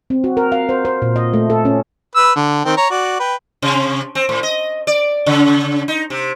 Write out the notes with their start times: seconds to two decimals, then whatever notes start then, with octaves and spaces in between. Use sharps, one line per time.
0.10 C4
0.24 F#4
0.37 A#4
0.52 F5
0.69 C5
0.85 C5
1.02 A#2
1.16 D#5
1.34 A3
1.50 A4
1.65 C#4
2.16 B4 E6
2.36 D3
2.65 D#3 C4 G5
2.77 C#5 A#5 C#6
2.91 F#4 D5
3.20 B4 G5
3.62 C3
4.15 C4
4.29 A2
4.43 D#5
4.87 D5
5.26 C#3
5.88 D#4
6.10 C3